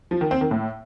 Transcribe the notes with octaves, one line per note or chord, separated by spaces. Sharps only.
F3
D#3
C4
D#3
A2